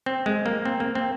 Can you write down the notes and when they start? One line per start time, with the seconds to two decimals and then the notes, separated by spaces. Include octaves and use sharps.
0.06 C4
0.26 G#3
0.46 A#3
0.65 C4
0.80 A#3
0.95 C4